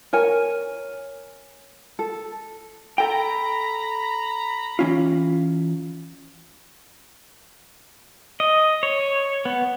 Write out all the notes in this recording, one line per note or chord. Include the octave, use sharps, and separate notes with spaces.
A#4 C#5 G#5
A4
A4 G5 A#5 B5
E3 C#4 F4
D#5
C#5
B3